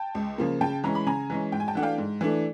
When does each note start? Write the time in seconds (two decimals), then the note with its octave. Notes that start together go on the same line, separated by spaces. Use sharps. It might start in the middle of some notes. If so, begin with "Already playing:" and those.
Already playing: G5 A5
0.15 C#2
0.38 C#3 F3 A#3
0.61 C#3 G5 A5
0.84 E3 G#3 C#4 A#5
0.95 B5
1.07 C#3 G#5 A#5
1.30 E3 G#3 C#4
1.52 G#2 G5
1.60 G#5
1.68 G5 A5
1.75 E3 A3 D4 F#5
1.83 F5 G5
1.98 G#2
2.21 E3 A3 D4